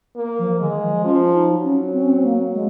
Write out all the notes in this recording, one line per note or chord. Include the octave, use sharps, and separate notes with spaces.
A#3
F3
D#3 G#3
F3
F3 C#4
D#4
F#3
C#4
C4
C#4
C4
A#3
G#3